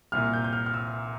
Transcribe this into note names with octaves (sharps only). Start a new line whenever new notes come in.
C2 A#2 F6
G6
G6
F6
F6
E6